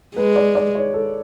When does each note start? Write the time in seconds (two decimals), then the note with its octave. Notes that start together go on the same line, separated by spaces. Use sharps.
0.16 G#3 B4
0.36 D5
0.55 D5
0.75 C#5
0.94 A4